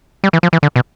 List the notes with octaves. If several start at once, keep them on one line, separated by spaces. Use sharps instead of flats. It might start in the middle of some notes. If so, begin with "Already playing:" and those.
G3
E3
F3
E3
D3
B2